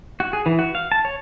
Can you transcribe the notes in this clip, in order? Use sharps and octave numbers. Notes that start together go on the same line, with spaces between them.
F#4
G#4
E3
F#4
F5
A5
C#5